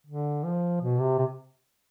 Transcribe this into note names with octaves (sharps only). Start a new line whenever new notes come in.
D3
F3
B2
C3
C3